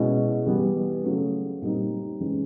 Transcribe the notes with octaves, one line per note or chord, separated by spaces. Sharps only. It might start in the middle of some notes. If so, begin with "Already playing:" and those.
Already playing: B2 G#3 C#4 E4
E3 G3 B3
C#3 F#3 A3
A#2 G3 C4 D#4
E3 G#3 C#4